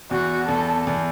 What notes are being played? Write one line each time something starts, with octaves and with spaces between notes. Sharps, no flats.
E2 F#4
E2 A4
E2